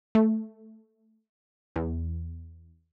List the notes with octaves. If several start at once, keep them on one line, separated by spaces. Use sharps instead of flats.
A3
E2